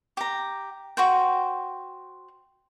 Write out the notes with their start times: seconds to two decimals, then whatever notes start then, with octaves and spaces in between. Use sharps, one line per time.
0.17 G4 A#5
0.97 F#4 C5 G5